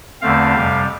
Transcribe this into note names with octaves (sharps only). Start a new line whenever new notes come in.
E2 D3 A3 C4 F5
F2 C3 G3